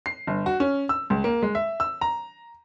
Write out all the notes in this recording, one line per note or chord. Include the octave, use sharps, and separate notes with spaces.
C7
G1
F#4
C#4
E6
C#2
A#3
G#3
E5
E6
A#5